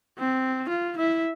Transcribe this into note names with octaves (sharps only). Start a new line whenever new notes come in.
C4
F4
E4 E5